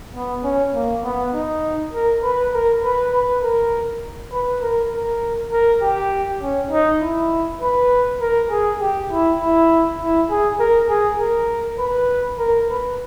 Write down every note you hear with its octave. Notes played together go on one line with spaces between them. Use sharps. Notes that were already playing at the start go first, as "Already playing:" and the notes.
B3
C#4
A#3
B3
D#4
A#4
B4
A#4
B4
B4
A#4
B4
A#4
A#4
A#4
G4
C#4
D#4
E4
B4
A#4
G#4
G4
E4
E4
E4
G#4
A#4
G#4
A#4
B4
A#4
B4